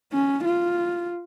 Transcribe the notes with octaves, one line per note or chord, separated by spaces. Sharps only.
C#4
F4